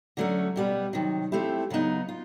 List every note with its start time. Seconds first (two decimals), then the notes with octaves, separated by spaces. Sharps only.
0.17 D3 F#3 A3 C#4
0.56 B2 G3 B3
0.93 C3 D#3 F#3
1.32 F3 A3 C4 E4 G4
1.70 C#3 F#3 B3 D#4
2.09 F4